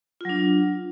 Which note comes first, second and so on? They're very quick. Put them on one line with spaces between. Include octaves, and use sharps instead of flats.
F4 F#3 D4